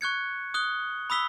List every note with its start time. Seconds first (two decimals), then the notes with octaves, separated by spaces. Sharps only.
0.01 C#6 F#6 G#6 C#7
0.54 D#6 F#6 G7
1.10 B5 D#6 E6 B6 G7